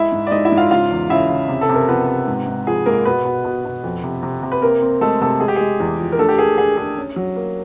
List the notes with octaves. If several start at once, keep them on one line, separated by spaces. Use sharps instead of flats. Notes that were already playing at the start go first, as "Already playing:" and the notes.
Already playing: G#3 E4 E5
G#2
D5
G#3 D#4 D#5
E4 E5
G#2
F4 F5
C#3 F4 F5
E2
C#3 E4 E5
C#3
C3
A4
C3
A#4
F3 B3 B4
C3
G#2
G#2
F3 G#4
G#2 A#3 A#4
B2 B3 B4
B2
B2
B2
F2
C3
C3
C3
B4
A#3 C4 A#4
C4
G#3 A3 A4
C3 A3 A4
G#3 G#4
G4
G#3 G#4
E2
F3
A#4
A3 D4 A4
G4
A#3 G#4
D4 G#4
D4 G#4
C#4
F#3
A#3